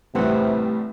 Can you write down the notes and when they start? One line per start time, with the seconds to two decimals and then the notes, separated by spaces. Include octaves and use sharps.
0.15 C2 A2 C3 E3 G3 A3 C4 F#5